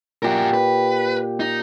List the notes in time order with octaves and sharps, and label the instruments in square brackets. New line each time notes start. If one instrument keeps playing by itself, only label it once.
[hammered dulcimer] A#2 G4 [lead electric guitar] F#4 A#4
[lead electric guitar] B4
D#4